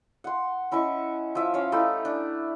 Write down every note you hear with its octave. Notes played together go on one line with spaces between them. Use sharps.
F#5 C6
C#4 E4 D#5 C#6
F3 E5
C#4 C#5 F5
A3 D#4 E4 G4
D4